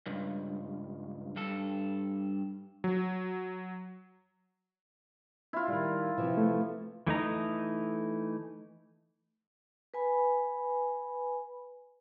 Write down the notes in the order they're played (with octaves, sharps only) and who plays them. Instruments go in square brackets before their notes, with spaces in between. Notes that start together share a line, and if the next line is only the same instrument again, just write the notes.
[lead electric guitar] C#2 G2
G2 A4
[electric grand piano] F#3
[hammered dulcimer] E4 F4
[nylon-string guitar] D#3 G3
C3 E3 F3
[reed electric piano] A3
[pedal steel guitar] E3 A3 D#4 A#5
[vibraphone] B4 G#5 B5